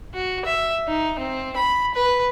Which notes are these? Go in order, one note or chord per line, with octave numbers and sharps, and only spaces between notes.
F#4
E5
D#4
C4
B5
B4